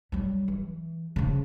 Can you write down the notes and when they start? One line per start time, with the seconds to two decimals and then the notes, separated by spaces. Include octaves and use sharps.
0.12 F#3 G3
0.48 E3
1.16 C#3 F3